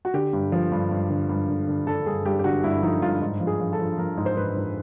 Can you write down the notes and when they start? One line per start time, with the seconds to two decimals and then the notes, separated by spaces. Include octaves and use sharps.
0.05 F#4
0.14 D3 G4
0.33 G2
0.52 F3
0.72 G2
0.91 G2
1.10 D3
1.29 G2
1.48 D3
1.67 D3
1.87 D3 A4
2.06 G2 G#4
2.25 G2 G4
2.39 G4
2.44 D3 F#4
2.64 G2 E4
2.83 F3 D#4
3.02 G2 F4
3.21 G#2
3.40 F3
3.47 G#4
3.60 F3
3.73 A4
3.79 F3
3.98 F3 A#4
4.17 G#2
4.26 C5
4.37 G#2 B4
4.56 G#2